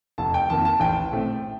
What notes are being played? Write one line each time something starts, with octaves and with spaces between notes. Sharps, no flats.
F1 A5
G5
F2 D#3 A#3 A5
A5
A1 G5
A2 A3 C4